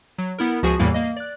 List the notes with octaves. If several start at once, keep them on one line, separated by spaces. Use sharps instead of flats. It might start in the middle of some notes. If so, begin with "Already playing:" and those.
F#3
B3 E4 A#4
C#2 F3 F#4 G#4 G#5 C#6
E2 A2 E3 G3 A#3 E4
A#3 D#5
D5 F#6